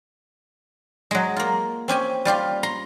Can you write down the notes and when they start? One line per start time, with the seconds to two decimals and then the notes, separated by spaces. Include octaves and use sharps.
1.11 F#3 G#3
1.36 A#3 F4
1.88 C4 C#4 G4 G#5
2.25 G3 F4 G4 F5
2.63 A#5 C6